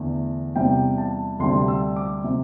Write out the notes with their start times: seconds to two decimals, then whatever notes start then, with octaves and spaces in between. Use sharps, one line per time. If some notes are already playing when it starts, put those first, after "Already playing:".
Already playing: E2 D3 A3
0.56 E2 C3 G3 G5
0.98 A5
1.39 D2 C3 G3 D4 C6
1.68 E6
1.96 D6
2.24 C3